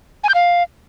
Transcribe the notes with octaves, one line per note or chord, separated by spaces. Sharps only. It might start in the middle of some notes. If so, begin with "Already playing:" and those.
G#5
G6
F5